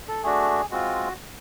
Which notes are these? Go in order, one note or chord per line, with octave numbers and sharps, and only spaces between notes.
A4
A3 D4 F#4 G#4
G#3 C4 F4 F#4